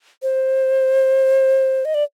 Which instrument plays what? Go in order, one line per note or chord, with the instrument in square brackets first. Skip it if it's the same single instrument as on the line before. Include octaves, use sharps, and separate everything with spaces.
[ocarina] C5
D#5
D5